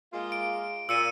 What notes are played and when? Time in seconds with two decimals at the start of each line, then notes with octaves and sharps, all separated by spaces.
0.13 G#3 A#3 F4
0.32 D7
0.89 A#2 E6 C#7 D#7